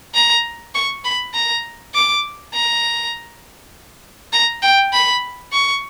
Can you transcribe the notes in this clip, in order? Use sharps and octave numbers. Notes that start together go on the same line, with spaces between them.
A#5
C#6
B5
A#5
D6
A#5
A#5
G5
B5
C#6